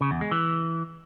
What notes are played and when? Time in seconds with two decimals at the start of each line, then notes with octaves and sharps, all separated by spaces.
0.01 C#3
0.11 E2
0.21 G#3
0.31 E3